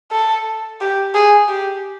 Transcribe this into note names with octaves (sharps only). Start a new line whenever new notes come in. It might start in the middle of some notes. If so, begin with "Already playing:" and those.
A4
G4
G#4
G4